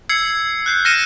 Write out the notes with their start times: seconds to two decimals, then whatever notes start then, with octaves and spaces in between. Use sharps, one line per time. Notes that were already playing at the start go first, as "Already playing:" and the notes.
0.09 E6 G#6 C7 C#7
0.66 F#6 G6 C7
0.85 F6 A#6 C#7 D#7 E7